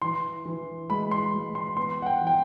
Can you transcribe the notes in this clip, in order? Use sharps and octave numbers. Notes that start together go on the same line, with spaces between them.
E3 C6
E3
G#3 B5
C6
G#3
C6
B3 C6
F#5
G5
E3
G5